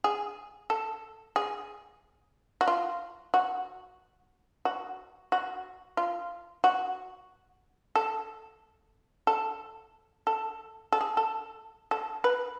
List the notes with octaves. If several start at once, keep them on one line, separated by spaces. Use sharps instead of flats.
G#4
A4
G#4
F#4
F4
F#4
F#4
F#4
F4
F#4
A4
A4
A4
A4
G#4
A4
A4
B4